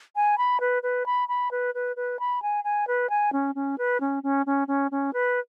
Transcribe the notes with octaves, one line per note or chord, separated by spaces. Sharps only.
G#5
B5
B4
B4
B5
B5
B4
B4
B4
B5
G#5
G#5
B4
G#5
C#4
C#4
B4
C#4
C#4
C#4
C#4
C#4
B4